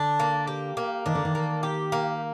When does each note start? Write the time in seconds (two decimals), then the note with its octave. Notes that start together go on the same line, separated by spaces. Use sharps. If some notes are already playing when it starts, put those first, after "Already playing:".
Already playing: D3 D4
0.20 A#3
0.47 G4
0.77 A#3
1.06 D#3 D4
1.15 D3
1.25 D#3
1.35 A#3
1.63 G4
1.92 A#3